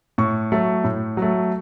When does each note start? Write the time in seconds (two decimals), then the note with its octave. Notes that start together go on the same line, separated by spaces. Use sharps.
0.18 A2 C#6
0.52 F#3 A3
0.84 A2
1.17 F#3 A3